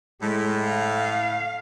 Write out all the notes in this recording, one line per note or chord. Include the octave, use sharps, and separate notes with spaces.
A2 G#3
F5